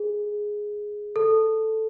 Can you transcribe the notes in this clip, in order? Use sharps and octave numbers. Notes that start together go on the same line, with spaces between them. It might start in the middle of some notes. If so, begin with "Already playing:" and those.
Already playing: G#4
A4